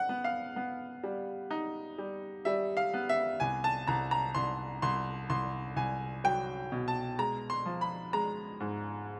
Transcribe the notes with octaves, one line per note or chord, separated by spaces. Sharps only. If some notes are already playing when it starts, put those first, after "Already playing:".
Already playing: F#5
B3
F5
B3
G3
D#4
G3
G3 E5
F5
B3
E5
C2 G#5
A5
C2 A#5
A#5
C2 C6
C2 C6
C2 C6
C2 G#5
F#3 G5
B2
A5
G#3 A#5
C6
F3
B5
G#3 A#5
G#2